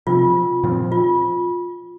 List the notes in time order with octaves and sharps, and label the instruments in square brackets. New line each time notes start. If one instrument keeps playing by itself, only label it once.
[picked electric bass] C3 F3 C4 [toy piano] F4
[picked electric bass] A#2 F3 C4
[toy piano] F4